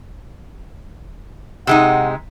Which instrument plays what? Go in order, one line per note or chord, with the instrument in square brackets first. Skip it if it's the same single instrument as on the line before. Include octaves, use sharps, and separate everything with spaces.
[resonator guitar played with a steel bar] C3 G#3 D#4 [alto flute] F#5